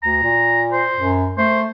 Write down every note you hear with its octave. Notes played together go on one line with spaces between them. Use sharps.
D2 A#5
A#2
C5
F#2
A3 C5